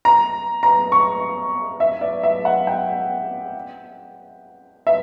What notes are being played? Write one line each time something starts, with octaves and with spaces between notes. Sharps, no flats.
A#5
A#5
C#6
E5
D5
E5
F#5
G5
E5